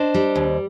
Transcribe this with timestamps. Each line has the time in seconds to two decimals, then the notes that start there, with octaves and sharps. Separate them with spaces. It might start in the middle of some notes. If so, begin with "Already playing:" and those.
Already playing: D4 C5 D#5
0.14 G3
0.36 D#2